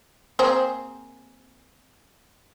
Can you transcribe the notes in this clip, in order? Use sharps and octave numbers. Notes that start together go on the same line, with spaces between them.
A#3 C4 G#4